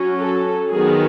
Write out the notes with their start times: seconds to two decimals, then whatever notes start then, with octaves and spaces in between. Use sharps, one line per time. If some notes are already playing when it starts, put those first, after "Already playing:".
Already playing: F#3 C#4
0.19 A4
0.70 D#3 F#3 B3 G#4